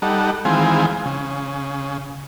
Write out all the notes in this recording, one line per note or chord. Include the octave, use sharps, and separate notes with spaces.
G3 D#4 A4 F#5
D#3 E3 G#3 C4 F4 G#5
C#3